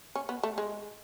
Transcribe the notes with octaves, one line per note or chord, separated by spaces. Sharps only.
C#4
B3
A3
G#3